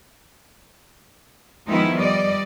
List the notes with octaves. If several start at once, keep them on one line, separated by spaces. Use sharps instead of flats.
D#3 F3 G#3 B3 D#4 E4
G3 D5 D#5